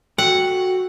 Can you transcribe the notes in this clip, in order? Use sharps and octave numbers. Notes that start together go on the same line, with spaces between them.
F#4 A4 F#5 G5